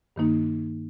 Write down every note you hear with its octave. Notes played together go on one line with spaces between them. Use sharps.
G2 D#3 A#3 D#4